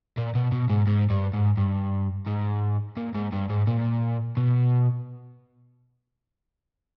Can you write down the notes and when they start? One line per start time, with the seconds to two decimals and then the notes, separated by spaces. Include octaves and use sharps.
0.17 A#2
0.35 B2
0.52 B2
0.70 G#2
0.87 G#2
1.10 G2
1.34 G#2
1.57 G2
2.27 G#2
2.97 A#2
3.15 G#2
3.33 G2
3.50 G#2
3.67 A#2
4.37 B2